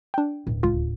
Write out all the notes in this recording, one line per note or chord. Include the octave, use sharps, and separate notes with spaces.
D4 G5
D1
C#2 F4